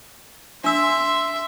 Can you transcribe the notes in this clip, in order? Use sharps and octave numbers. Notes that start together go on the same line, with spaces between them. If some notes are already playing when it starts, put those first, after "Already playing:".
D4 E5 C6 E6